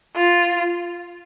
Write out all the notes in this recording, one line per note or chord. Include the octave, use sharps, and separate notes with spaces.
F4